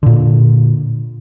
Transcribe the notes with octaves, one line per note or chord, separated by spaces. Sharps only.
A#2 D3